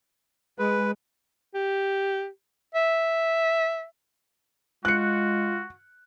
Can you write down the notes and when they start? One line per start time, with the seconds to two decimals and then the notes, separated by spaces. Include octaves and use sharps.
0.59 G#3 B4
1.54 G4
2.75 E5
4.85 G#3 F4 F#4 F#6 C#7